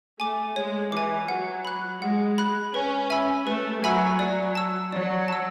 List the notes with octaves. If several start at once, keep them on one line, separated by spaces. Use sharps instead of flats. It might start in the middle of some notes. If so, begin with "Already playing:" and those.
A3 G#5 D6
G#3 C#5
E3 G#5 D6
F#3 F#5
B5 F#6
G#3 F#5
B5 F#6
C#4 B4
E5 G#5 B5 E6
A3 B4
F#3 E5 G#5 B5 E6
F#3 D5
A5 E6
F#3 D5
A5 E6